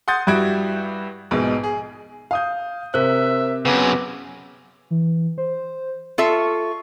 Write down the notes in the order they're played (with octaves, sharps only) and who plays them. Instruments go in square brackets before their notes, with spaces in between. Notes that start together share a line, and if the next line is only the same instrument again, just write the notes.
[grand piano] F#5 C6 D#6 G6 A6
G2 G3 E4 F#4 G#6 D7
A#1 G#2 B2
G#4
[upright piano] F5 D#6 G6
[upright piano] C3 F#6 [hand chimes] A#4 C5 [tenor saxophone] E5
[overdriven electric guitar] F#2 C#3 [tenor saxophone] B3 [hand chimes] D6 E6
[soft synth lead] E3
C5
[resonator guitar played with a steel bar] F4 A4 E5 [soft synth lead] C#6